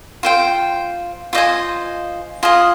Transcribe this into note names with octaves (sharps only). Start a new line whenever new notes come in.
F4 C5 G5
F4 C5 D#5 G#5
F4 G#4 D#5